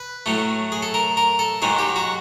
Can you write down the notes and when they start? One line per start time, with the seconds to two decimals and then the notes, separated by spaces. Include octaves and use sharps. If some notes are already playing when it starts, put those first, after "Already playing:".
Already playing: B4
0.26 A2 F#3 A3
0.72 G#4
0.82 A4
0.94 A#4
1.17 A#4
1.39 A4
1.62 G#2 D#3 F#3 G#4
1.79 G4
1.96 F#4